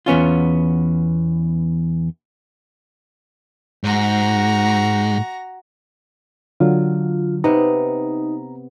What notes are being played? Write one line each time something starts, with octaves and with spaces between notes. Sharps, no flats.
E2 B3 C#4 F4
G#2 F#4 A#5
D3 F#3 F4
C3 B3 D#4 A#5